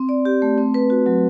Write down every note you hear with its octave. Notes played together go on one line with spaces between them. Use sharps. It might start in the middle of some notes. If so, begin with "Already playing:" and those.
Already playing: C4
D5
G4
A3
C4
B4
F#4
F#3